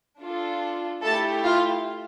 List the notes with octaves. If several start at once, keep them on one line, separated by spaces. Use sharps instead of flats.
D4 F4 A4
A3 E4 G4 A4 A5
F4 F5